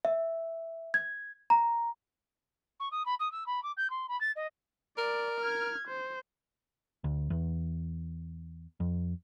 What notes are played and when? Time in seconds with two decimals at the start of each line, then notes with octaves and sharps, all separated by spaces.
0.05 E5
0.94 G#6
1.50 A#5
2.80 C#6
2.91 D#6
3.06 B5
3.20 D#6
3.32 E6
3.46 B5
3.63 D6
3.77 G6
3.90 C6
4.09 B5
4.21 A6
4.36 D#5
4.97 A#4 D5
5.40 F6 G#6
5.88 C5
7.04 D2
7.30 E2
8.80 F2